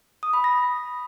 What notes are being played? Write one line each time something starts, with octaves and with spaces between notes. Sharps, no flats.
D#6
B5
A#6